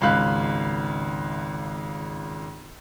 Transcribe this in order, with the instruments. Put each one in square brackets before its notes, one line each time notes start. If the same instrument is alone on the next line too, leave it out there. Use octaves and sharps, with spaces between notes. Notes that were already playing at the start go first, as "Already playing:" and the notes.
[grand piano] G#1 C#2 F5 B5 F#6